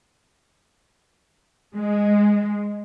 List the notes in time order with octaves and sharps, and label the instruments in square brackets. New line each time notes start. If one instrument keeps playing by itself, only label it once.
[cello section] G#3